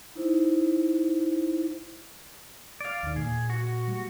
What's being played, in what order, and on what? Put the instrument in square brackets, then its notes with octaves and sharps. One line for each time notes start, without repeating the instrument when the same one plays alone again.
[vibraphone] D#4 E4 C5
[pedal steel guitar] D5 F5
[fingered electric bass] D#2 D#3
[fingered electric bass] A#2 [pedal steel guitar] G#4
[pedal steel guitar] F#4
[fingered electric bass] G3